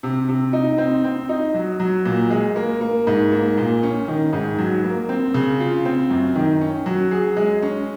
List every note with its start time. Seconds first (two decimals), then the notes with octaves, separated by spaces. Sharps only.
0.03 C3
0.29 C3
0.53 D#4
0.78 C4
1.05 C4
1.29 D#4
1.54 F#3
1.80 F#3
2.06 A#2
2.30 G#3
2.56 A#3
2.81 A#3
3.07 G#2
3.32 A#3
3.58 A#2
3.83 C#4
4.08 D#3
4.33 G#2
4.58 F#3
4.84 A#3
5.09 C4
5.34 C#3
5.60 F4
5.85 C4
6.10 F#2
6.35 D#3
6.61 C#4
6.86 F#3
7.11 G#4
7.37 G#3
7.62 C#4